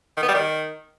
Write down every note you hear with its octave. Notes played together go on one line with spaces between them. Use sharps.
D#3
B3
G3
D#3